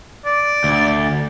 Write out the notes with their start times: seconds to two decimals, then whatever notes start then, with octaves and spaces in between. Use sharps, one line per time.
0.25 D5
0.64 D2